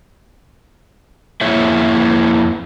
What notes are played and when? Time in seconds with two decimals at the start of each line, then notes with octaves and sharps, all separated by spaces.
1.41 F2 A#3 E4 G#4 C#5 E5